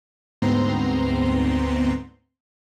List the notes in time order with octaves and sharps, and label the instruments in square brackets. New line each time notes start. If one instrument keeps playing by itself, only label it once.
[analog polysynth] D2 G#2 B3 C4 A#5 C6